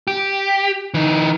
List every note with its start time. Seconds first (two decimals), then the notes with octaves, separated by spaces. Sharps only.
0.07 G4
0.94 E3 D#4